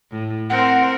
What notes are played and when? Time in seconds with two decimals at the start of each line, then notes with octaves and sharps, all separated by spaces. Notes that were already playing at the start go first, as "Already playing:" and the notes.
0.11 A2
0.50 C4 A#4 C5 F#5